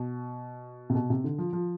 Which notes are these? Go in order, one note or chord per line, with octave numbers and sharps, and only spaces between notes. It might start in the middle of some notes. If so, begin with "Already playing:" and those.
Already playing: B2
C3
B2
C3
D3
F3
F3